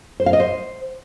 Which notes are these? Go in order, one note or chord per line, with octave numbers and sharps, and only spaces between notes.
C5
F5
D#5
C5